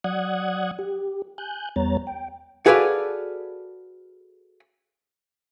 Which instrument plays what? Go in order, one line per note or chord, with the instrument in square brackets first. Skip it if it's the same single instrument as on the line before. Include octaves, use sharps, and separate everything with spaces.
[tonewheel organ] F#3 D5 F#5 D#6 F#6 G#6
G4
G#5 F#6 G6
E2 G3 B3 C#5 A#5 A6
G5
[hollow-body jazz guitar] F#4 G#4 A4 B4 D5 F5